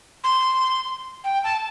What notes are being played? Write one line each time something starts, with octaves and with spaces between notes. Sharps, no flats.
C6
G5
A5